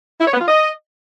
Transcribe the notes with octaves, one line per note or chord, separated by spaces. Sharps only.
E4
C#5
B3
F4
D#5